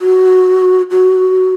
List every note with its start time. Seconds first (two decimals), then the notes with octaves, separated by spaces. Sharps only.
0.01 F#4
0.91 F#4